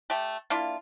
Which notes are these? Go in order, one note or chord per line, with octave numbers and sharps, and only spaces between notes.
A3 G4
A#3 D4 E4 F4